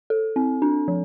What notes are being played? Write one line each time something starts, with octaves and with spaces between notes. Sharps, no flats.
A4
C4
D4
F3